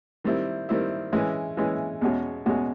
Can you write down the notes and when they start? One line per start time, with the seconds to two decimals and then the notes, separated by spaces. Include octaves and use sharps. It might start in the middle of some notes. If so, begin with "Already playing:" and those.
0.24 D#3 G3 C4 E4
0.69 D#3 G3 C4 E4
1.12 E3 G#3 C#4 E4
1.57 E3 G#3 C#4 E4
2.01 E2 B2 G#3 C#4 F#4
2.46 E2 B2 G#3 C#4 F#4